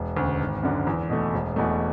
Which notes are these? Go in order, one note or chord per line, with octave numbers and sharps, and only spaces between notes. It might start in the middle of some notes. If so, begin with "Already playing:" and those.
Already playing: E1
D2 C#3
G#1
F#2 D3
E2
B2 A3
E1
E2 B2 A3